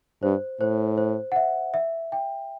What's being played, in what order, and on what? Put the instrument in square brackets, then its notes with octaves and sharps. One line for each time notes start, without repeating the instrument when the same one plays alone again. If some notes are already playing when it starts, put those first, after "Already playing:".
[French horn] G2 [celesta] C5
[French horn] A2 [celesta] C5
[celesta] C5
F#5
E5
E5
G5